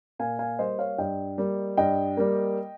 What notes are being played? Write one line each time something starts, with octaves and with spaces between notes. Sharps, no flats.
A#2 F5 G#5
F5 G#5
G3 A#3 C5 D#5
C#5 F5
G2 D#5 G5
G3 A#3
G2 D#5 G5
G3 A#3